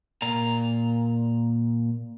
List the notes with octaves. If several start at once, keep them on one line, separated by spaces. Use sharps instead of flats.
A#2 A#5